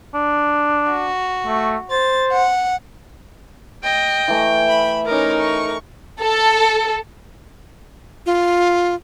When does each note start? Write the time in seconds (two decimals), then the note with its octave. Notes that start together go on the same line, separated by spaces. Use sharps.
0.14 D4
0.91 F#4
1.47 A3
1.91 C5 A6
2.32 F#5
3.84 D#5 G5
4.28 E3 A3 G#5
4.64 E5 B5
5.06 C#4 D#4 A#4 D6
5.39 C#6
6.20 A4
8.26 F4